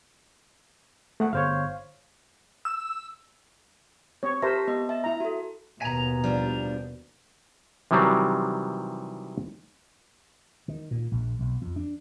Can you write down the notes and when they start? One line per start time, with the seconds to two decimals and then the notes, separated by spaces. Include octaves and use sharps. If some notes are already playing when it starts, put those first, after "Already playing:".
1.20 A3 F#5
1.33 G1 C5 C#5 F5
2.65 E6
4.23 C4 C#5
4.42 G4 A#4 C5 E5 A5 A#6
4.67 B3 D#5
4.89 E5 A5
5.04 E4 A#5
5.20 F#4 A4
5.82 D#2 B2 G#5 A#5
6.24 F3 G3 D4
7.91 C3 D#3 E3 F#3 G3 C4
10.68 D#3
10.91 A#2
11.12 A#1
11.40 B1
11.62 F2
11.76 D4